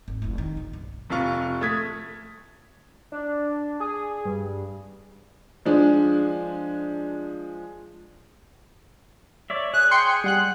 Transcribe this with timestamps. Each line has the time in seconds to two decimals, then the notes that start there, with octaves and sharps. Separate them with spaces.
0.08 G#1
0.22 F1 E4
0.38 D#3
0.57 B1
0.73 G2
1.10 F1 C3 F4 F5 C#6
1.61 A3 D#6 G#6 B6
3.12 D4
3.80 G#4
4.25 G2
5.66 F3 G#3 D4
9.50 C#5 D5 E5
9.74 G#4 F#6
9.91 G5 C6 G6 C#7
10.08 G5
10.24 G3 F#5 F#6